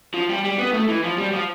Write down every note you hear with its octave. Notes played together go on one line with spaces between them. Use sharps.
F3
G3
G3
B3
A3
E3
F3
G3
F3